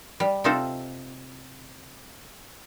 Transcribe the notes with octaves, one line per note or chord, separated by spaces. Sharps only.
G3
C3 C4 D#4 F4 A4 C5